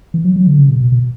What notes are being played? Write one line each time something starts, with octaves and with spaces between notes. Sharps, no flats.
E3
F#3
F#3
D3
C#3
B2
B2
B2